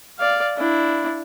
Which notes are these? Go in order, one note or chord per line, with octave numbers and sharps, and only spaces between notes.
D5 F5
D4 E4